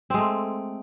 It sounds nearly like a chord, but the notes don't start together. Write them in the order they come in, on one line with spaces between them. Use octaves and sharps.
C4 G#3 A3